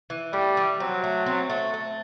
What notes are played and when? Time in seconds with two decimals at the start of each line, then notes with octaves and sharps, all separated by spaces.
0.10 E3
0.33 G3 A3
0.57 E3
0.80 F#3 C4
1.04 A3
1.26 C4
1.50 A3
1.74 A3